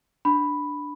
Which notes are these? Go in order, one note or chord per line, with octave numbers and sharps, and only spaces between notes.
D4 B5